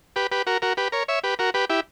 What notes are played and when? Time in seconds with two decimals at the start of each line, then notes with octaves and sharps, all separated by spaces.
0.16 G4 B4
0.32 G4 B4
0.47 F#4 A#4
0.62 F#4 A#4
0.77 G4 B4
0.92 A#4 C#5
1.08 C#5 E5
1.24 G4 B4
1.39 F#4 A#4
1.54 G4 B4
1.69 E4 G4